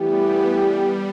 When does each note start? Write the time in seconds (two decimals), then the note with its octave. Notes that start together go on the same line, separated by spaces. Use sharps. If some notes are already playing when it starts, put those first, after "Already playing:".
Already playing: E3 G3 A3 B3 E4 G4
0.16 G3
0.72 G3